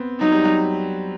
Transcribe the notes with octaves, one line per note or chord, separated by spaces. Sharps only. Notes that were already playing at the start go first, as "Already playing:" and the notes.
Already playing: B3 C4
F#3 D#4
G3
F#3